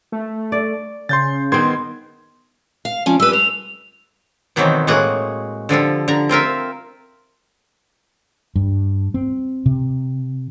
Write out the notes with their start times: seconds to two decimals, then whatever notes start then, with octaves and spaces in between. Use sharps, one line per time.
0.12 A3
0.52 D5
1.09 C#3 C6 G6 A6
1.52 D#3 B3 C4 C6 G#6
2.85 F5
3.06 F3 C#4 D5
3.20 G3 B4 E6
3.33 C5 F7
4.56 B2 D#3 E3 F#3 B3 C4
4.87 A2 G#3 A#3 F#4 G#4 F#5
5.69 D3 F3 G3 A4
6.08 D3 A#5
6.29 C4 F4 A#4 E5
8.56 G2
9.14 C4
9.66 C3